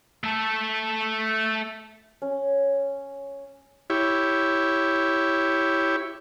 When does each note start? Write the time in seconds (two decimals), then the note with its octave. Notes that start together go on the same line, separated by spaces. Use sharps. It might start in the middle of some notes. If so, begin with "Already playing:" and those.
0.24 A3 A4
2.22 C#4
3.90 E4 G4 C#5